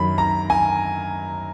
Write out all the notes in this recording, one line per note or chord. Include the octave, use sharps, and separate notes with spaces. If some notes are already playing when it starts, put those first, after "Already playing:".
Already playing: F#2 D#3 F#3 B5
A#5
G#5